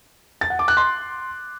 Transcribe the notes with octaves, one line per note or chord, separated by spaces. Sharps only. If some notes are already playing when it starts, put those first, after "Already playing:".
A6
F#5
D6
F#6
C6